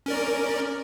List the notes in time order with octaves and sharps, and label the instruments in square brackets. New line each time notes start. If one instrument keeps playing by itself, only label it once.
[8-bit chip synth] C#4 A#4 D5